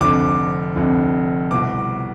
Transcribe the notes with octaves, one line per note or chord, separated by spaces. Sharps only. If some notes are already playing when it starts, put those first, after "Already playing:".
F1 F2 D3 D6
F1 F2 D3
C2 B2 D6